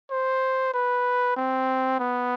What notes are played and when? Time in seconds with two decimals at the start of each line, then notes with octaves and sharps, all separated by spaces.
0.11 C5
0.74 B4
1.37 C4
2.00 B3